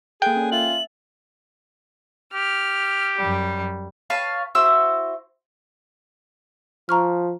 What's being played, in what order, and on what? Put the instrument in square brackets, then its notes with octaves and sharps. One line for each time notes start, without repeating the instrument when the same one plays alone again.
[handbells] A#3 A4 F#6 [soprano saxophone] G#4 [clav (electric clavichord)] G5
[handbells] C#4 D5
[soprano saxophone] F4 [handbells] E5 A6 [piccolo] F#7
[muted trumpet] G4 [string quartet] F6
[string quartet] F#2 G3
[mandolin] B4 C#5 F5 A5
E4 F#4 C5 E6
[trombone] F3 [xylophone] A#5 C#6 F6